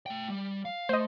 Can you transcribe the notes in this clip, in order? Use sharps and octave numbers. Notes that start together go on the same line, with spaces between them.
A3 G5
G3
F5
A3 C5 D#5